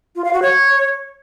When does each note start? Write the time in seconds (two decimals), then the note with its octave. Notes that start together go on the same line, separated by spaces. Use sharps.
0.15 F4
0.24 F5
0.33 F#4
0.42 C#5